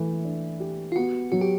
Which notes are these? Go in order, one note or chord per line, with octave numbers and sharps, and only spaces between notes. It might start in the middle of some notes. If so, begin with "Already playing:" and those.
Already playing: E3 A3
D4
G4
F4
B3 F#4
F#3 F#4
G4